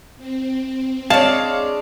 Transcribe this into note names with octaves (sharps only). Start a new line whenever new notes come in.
C4
G#3 D4 C#5 F5 A5